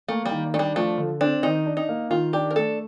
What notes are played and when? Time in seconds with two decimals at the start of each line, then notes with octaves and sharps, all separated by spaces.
0.08 A3 A#3
0.26 G3
0.31 D#3
0.54 A3 D4
0.59 G3
0.76 F3 A3
0.98 D3
1.21 C4 D4
1.43 D#3 D#4
1.66 D4
1.77 D#4
1.89 A#3
2.10 D#3 F4
2.33 D4 G4
2.51 A#4
2.56 A3 A4